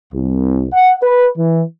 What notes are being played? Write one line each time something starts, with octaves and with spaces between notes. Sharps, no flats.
C2
F#5
B4
E3